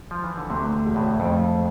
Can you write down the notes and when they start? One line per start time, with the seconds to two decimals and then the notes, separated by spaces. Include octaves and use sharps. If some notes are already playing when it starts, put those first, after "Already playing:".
0.11 F3
0.24 E3
0.38 D3
0.50 D2 C3
0.85 E1
0.96 A2
1.20 F2 A2